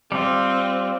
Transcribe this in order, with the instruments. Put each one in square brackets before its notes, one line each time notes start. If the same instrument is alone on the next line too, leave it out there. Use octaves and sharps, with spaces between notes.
[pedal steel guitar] G3 F4 [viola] C4